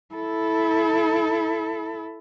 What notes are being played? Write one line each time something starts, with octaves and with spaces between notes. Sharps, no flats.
E4 A4